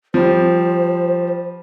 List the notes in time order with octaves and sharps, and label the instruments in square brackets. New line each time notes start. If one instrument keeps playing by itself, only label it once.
[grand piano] F3 G3 [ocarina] C5